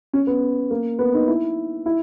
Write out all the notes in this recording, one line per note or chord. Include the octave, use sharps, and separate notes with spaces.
C#4
B3
A#3
B3
D#4
E4
E4